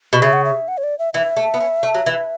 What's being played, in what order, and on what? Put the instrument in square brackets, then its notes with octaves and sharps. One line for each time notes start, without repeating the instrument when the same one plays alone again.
[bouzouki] B2
[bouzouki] C#3 [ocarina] E5
[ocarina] F#5
E5
F#5
C#5
D5
E5
[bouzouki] E3 [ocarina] E5
[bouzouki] A3
B3
C#4
A3
F#3
E3